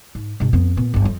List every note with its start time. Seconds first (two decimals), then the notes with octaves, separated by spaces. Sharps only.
0.15 G#2
0.40 G2 B2
0.53 F2 B3
0.77 A#2 B3
0.94 G1 G2
1.05 F2